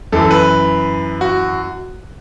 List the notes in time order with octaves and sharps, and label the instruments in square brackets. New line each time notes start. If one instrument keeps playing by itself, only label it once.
[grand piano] F#2 E3 A4
B4
F#4